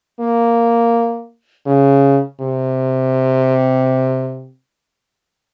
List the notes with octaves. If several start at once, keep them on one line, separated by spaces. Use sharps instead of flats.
A#3
C#3
C3